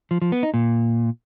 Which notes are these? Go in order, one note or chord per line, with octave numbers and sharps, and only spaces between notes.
F3
F3
B3
D#4
A#2